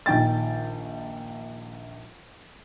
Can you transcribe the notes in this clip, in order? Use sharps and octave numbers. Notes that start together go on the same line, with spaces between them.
A#1 D#3 G5 A6